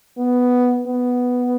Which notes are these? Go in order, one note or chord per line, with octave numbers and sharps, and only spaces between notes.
B3
B3